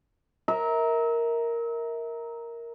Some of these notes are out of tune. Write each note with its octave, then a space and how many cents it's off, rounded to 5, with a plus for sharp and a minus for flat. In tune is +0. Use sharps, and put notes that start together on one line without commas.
A#4 +0 E5 -35